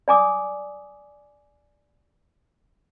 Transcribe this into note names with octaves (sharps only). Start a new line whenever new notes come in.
D5 G#5 D6 D#6